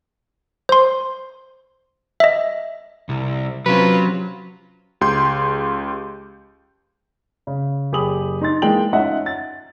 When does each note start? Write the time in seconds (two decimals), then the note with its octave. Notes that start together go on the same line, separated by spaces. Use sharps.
0.69 C5 C6
2.20 D#5 E5
3.09 C2
3.66 C3 F#3 C#4 F4 B4
5.01 C#2 G4 C6 G6
7.47 C#3
7.92 F#1 G4 G#4 B5 D#6 F#7
8.41 D#4 C6 A6
8.62 E3 G#3 A#3 G5 F#7
8.93 C#4 D#4 F4 D#5 E5 F#5
9.26 A6